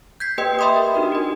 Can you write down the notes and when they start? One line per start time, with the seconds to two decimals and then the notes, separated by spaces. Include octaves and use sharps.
0.20 G6 G#6 B6 C7
0.38 A#3 G4 B4 D#5 G5 C#7
0.59 E5 B5 C6 D6 D#6
0.76 A#4
0.94 D4 D#4 F#4 A#4
1.12 G4 D#5